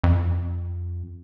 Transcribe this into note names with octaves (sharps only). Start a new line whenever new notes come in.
F2